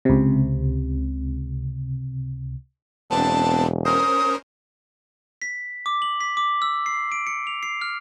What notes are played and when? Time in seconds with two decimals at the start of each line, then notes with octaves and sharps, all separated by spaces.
0.05 C#2 C3
3.11 E1 B3 C4 D4 A5
3.85 C#4 A#4 C5 D#6
5.42 B6
5.86 D6
6.02 F#7
6.21 B6
6.37 D6
6.62 E6
6.86 C7
7.12 D7
7.27 C#7
7.47 F7
7.63 C7
7.81 F6